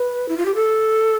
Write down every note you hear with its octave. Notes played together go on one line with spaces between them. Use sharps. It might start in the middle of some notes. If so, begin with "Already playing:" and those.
Already playing: B4
E4
F4
G4
A4